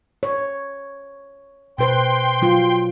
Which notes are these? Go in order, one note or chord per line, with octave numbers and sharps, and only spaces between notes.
C#5
B2 B4 C5 G5 C6
F#3 F4